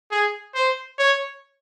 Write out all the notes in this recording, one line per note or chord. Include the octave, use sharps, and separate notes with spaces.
G#4
C5
C#5